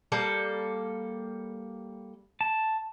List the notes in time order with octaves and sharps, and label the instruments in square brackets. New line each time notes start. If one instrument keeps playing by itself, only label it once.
[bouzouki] G3 A#3 A4
[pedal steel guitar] A5